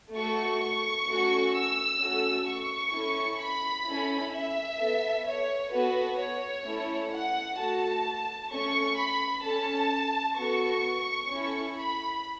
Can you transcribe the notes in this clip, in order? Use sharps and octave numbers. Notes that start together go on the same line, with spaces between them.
A3 F#4 A4 C#6
C#6
A3 C#4 F#4 A4
E6
A3 C#4 F#4 A4
C#6
C#4 E4 A4
B5
C#4 E4 A4
E5
B3 A4
C#5
B3 F#4 A4 B4
C#5
A3 C#4 E4 A4
F#5
A3 F#4 A4 A5
A3 C#4 A4 C#6
B5
C#4 A4 A5
B3 F#4 A4 C#6
C#4 E4 A4
B5